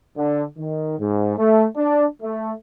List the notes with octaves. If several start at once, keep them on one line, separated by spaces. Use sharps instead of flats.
D3
D#3
G#2
A3
D4
A3